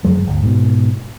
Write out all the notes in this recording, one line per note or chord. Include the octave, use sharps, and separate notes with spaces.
G1 F#2 F#3 G#3
G1 D2
G#2 B2